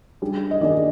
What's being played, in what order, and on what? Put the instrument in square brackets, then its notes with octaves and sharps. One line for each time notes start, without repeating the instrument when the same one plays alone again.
[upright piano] G3 D4 G#4
[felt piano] D#5
[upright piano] D#3 A#3 D4 G#4 [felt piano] D5